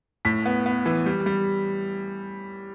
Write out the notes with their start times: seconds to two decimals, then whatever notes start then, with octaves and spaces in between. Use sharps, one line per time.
0.25 A2 B6
0.45 B3
0.66 B3
0.86 E3
1.06 G3
1.26 G3